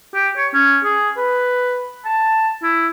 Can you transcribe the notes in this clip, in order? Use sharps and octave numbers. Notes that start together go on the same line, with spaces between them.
G4
C#5
C#4
G#4
B4
A5
E4